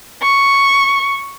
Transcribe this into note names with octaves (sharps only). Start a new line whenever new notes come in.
C#6